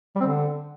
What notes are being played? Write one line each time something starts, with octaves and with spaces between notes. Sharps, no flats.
G3
C4
D3